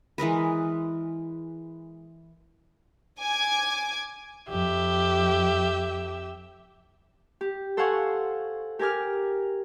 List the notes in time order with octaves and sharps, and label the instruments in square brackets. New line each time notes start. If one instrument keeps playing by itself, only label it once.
[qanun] E3 G#3 A#4 B4
[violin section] G#5 D6 G#6
[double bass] F2 [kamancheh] G4 E5
[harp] G4
A4 C5 F5 F#5 G#5 C#6
G4 A#4 G#5 D6 F6